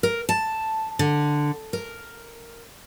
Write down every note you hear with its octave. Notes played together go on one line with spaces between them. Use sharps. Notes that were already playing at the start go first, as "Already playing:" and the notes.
A#4
A5
D3
A#4